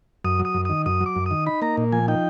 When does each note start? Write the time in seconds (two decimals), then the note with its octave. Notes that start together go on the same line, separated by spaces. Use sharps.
0.24 F#2 D#6
0.40 F#3
0.45 D#6
0.54 F#2
0.65 D#3 D#6
0.86 F#2 D#6
1.01 F#3
1.06 D6
1.16 F#2
1.26 D#3 D#6
1.46 D#4 B5
1.62 A#3 A#5
1.77 A#2
1.92 F3 G#5
2.08 D#4 G5